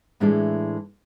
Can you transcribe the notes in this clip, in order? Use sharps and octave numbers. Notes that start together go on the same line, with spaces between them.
A2 E3 G#3 D4 E4 A4